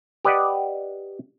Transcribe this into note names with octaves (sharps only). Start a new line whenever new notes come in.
G4 B4 D5 D#5 F#5